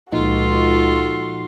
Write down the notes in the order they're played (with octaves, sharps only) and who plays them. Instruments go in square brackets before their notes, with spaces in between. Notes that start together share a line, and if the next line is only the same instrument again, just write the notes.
[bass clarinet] C#2 [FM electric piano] A#2 F3 D#4 [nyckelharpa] F4 A4 [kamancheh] F#4 C6